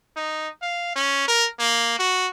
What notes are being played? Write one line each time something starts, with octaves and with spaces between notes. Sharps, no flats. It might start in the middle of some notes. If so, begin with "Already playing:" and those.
D#4
F5
C#4
A#4
A#3
F#4